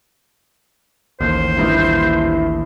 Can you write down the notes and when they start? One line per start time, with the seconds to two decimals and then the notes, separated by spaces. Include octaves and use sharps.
1.21 A1 D#2 C5
1.58 D#1 G2 E4